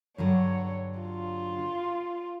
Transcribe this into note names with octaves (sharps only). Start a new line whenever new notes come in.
G2 D3 F#3 C#5
F4